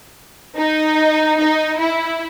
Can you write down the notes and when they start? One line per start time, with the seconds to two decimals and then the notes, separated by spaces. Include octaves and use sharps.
0.57 D#4
1.40 D#4
1.80 E4